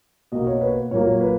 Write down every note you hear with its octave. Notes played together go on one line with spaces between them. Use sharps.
B2 A#3 D#5
C#5
B4
A#2 F#3 A#3 C#5
B4